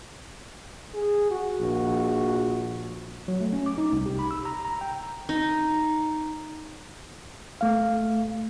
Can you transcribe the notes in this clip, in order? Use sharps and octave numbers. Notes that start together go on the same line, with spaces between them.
G#4
F#4
A#1
F#3
A3
C#4
D6
D#4
C2
G4
B5
E6
A#5
A#5
G5
D#4
A3 F5